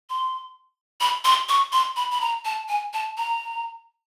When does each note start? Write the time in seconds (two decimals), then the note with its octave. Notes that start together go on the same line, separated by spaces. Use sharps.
0.10 C6
1.00 B5
1.24 C6
1.49 C#6
1.72 C6
1.96 B5
2.11 B5
2.21 A#5
2.45 A5
2.69 G#5
2.93 A5
3.17 A#5